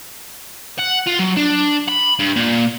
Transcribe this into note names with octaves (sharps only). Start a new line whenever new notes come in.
F#5
F4
F#3
D4
B5
G2
A#2